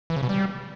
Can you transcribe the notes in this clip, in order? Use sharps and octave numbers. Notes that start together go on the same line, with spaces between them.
E3
C#3
B2
G3